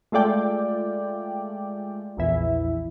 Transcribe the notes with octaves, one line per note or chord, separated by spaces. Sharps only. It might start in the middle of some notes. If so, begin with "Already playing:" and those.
G#3 A3 F4 D5 G5
A#1 E2 E4